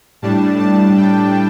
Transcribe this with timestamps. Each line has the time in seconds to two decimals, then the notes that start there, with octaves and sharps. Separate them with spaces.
0.22 A2 G3 D4 A5
0.59 A5
0.97 G5